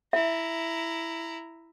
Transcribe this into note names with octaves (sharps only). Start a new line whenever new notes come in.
E4 E5 A#5